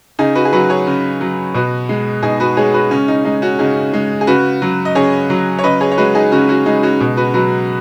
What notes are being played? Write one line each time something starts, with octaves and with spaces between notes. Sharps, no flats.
C#3 D#4 G#4
F#4 B4
G#4
F#3 F#4 B4
G#4 C#5
C#3
F#3
B2 F#4 B4
G#3
B2 D#4 G#4
F#4 B4
G#3 G#4 C#5
F#4 B4
C#3 C#4
D#4
G#3 D#4
C#4 F#4
C#3 D#4 G#4
G#3
G#4
C#3 F#4 B4
F#3
D#5
C#3 G#4 C#5
F#3
C#5
C#3 B4 D#5
G#4 C#5
C#5
G#3 F#4 B4
D#4 G#4
C#3 C#4 F#4
C#4 F#4
G#3 D#4
C#4 F#4
B2
F#4 B4
F#3 F#4 B4